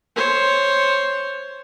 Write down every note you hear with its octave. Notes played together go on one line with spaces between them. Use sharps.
C5 C#5